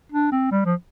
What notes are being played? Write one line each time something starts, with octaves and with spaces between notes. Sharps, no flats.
D4
C4
G3
F3